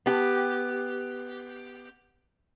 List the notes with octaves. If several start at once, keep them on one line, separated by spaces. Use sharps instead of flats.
B3 G4